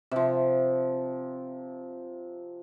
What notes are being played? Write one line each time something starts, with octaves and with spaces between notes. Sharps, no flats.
C3 F3